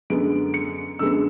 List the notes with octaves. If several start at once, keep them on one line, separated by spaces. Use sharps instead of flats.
F#2 D3 G#3 B3 D7
C#7
F#2 D3 G#3 B3 E6